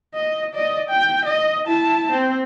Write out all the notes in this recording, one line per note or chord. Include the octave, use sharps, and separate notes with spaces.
D#5
D5 D#5
G5
D#5
E4 A5
C4